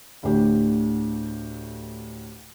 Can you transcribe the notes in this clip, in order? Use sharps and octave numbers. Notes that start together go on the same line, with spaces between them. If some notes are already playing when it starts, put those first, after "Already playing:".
D2 A2 D3 G4